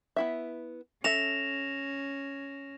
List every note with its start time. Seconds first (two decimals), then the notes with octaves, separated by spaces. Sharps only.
0.16 B3 E4 E5
1.04 C#4 A4 E5 A#6 E7 F7